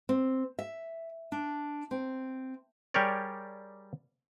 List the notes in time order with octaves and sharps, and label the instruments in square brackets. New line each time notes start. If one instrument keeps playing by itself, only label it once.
[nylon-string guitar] C4
E5
D4
C4
[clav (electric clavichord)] G3 G4 G#4 A#4 C#5 D5